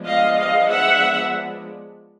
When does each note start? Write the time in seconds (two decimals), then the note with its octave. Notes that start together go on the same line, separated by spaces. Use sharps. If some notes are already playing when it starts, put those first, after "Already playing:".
Already playing: F3 G#3 B3 D4
0.08 D#5 F5
0.39 D#5 F5
0.71 E5 F#5